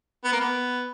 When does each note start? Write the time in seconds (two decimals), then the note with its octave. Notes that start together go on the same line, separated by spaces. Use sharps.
0.24 B3
0.33 A#3
0.40 B3